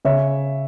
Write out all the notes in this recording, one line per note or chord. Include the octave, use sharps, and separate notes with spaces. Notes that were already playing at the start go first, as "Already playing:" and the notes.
C#3 C#5 E5